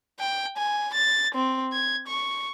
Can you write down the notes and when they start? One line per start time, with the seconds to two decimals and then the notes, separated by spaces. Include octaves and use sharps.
0.20 G5
0.57 G#5
0.94 A6
1.34 C4
1.73 G#6
2.08 C#6